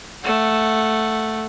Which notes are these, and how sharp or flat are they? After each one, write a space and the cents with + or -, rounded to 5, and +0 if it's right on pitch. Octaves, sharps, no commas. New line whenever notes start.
A3 +0 F#5 -5